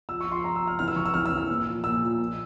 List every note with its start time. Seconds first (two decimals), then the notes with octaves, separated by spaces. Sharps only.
0.09 F3 E6
0.21 C#6
0.27 F3
0.32 C6
0.44 F3 A#5
0.56 E6
0.61 F3
0.67 F6
0.79 E3 F6
0.88 E6
0.96 E3 C#6
1.05 E6
1.14 E3 F6
1.26 E6
1.32 E3
1.37 E6
1.49 A#2
1.67 F3
1.84 A#2 E6
2.02 F3
2.19 A#2